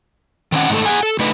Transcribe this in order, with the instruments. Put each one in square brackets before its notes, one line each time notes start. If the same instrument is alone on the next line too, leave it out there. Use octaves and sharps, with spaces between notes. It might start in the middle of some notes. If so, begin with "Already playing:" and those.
[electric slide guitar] D#3 C4 C#4 F#5
G#2 D#3 A3 A4
G#4 F#5 G#5
A4
D3 A3 D#4 B4